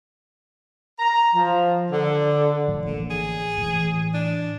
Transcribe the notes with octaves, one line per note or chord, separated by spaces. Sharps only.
A#5
F3
D3
A2 F3
A1 D3 A#3
G#4
A2 E3
D4